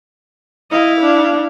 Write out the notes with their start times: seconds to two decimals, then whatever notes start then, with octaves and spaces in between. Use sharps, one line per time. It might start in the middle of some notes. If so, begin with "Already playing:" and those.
0.71 E4 D#5 F5
1.00 D4